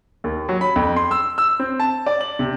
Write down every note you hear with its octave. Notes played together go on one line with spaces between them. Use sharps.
D#2
F#3
B5
F2
C6
E6
E6
C4
A5
D5
F#7
C3